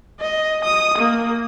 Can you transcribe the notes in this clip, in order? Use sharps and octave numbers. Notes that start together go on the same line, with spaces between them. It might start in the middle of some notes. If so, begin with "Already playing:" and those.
D#5
D#6
A#3